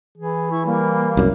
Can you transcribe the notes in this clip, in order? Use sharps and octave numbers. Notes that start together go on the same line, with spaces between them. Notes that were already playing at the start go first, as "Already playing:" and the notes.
E3 G#4
E4 C#6
G3 A#3
C2 F#2